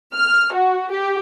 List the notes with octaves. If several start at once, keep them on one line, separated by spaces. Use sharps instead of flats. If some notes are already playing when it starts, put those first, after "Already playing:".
F6
F#4
G4